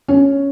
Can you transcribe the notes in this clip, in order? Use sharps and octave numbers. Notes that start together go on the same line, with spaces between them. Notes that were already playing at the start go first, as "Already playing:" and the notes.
C#4